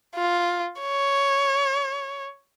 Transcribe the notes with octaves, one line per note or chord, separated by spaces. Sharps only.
F4
C#5